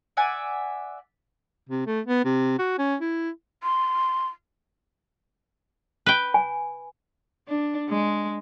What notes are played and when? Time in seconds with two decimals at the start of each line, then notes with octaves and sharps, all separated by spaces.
0.17 D5 E5 F#5 G#5
1.69 C3
1.86 A3
2.07 B3
2.25 C3
2.59 F#4
2.78 C#4
3.01 E4
3.63 C6
6.06 B4 G5
6.34 G#5
7.48 D4
7.90 G#3